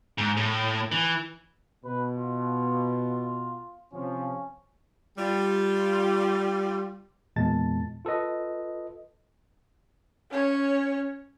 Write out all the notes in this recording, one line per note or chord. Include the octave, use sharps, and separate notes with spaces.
G#2
A2
E3
B2 B4
F4
C3 F3 C#4
G3 F4
E2 A#2 G#3 A5 A6
F4 A4 B4 D#5
C#4 C#5